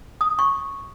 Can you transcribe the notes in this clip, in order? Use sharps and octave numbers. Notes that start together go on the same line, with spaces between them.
D#6
C#6